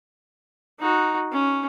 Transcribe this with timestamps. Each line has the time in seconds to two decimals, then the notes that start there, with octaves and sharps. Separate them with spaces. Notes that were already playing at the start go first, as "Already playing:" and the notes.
0.80 D#4 F#4
1.32 C#4